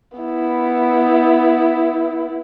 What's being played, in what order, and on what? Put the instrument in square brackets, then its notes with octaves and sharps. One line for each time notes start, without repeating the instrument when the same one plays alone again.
[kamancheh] B3 E4